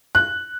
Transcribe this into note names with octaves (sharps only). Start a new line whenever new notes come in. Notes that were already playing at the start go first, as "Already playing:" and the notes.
F#6